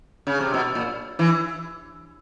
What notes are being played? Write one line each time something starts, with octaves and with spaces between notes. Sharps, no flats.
C#3
C3
B2
A#2
E3